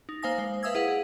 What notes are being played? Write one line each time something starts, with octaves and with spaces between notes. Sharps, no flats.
D#4
A#3 C5 F5 G#5 D#6 A#6
G#3 C5
B4 E5 F5 D#6 E6 G#6
E4 G#4 B4 F5 F#5
G#4